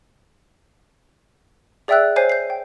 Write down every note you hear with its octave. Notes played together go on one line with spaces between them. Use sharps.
G#4 D5 E5 G5 E6 F#6
C5 C#5 G#5 G6 C7
G6 C7
G5